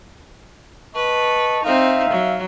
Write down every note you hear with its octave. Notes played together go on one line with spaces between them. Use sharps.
B4 D#5 A5 C#6
C4 D#4 E5 F5
F#3